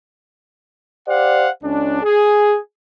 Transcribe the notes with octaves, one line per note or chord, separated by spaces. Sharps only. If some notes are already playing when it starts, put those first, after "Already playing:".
G4 C5 D5 F5 F#5
C#2 C#4 D4
G#4